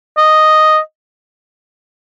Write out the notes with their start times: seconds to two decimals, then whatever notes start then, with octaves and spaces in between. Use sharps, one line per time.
0.18 D#5